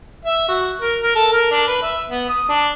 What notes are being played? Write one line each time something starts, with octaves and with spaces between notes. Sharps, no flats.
E5
F#4
A#4
A#4
A4
A#4
D4
B4
E5
B3
D#6
D4